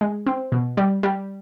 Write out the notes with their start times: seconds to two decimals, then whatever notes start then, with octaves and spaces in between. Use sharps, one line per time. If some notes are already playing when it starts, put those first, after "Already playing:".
0.01 G#3
0.26 C4
0.52 B2
0.77 G3
1.03 G3